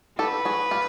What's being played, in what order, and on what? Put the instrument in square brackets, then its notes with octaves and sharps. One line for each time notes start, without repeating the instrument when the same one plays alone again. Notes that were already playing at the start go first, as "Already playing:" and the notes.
[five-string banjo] G4 A4 [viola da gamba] B4
[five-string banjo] F#4 G#4
F4 G4